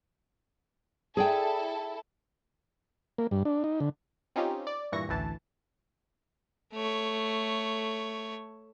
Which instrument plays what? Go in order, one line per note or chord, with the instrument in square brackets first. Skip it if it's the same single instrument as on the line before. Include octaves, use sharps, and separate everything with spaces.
[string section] E4 A4 [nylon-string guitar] G#4 D5 G5
[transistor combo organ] A#3
G2
D4
D#4
D3
[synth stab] C4 C#4 D#4 F4 G4
D5
G2 A#2 E3 C#6 A#6
A1 D2 E3 A5
[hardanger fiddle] A3 C#5